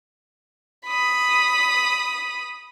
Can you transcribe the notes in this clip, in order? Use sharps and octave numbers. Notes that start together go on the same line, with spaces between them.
B5 D#6